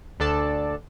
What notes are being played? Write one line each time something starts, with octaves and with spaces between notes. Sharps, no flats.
D2 D4 A4 D5 A5